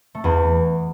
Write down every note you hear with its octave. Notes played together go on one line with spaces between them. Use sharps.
A3
E2 B3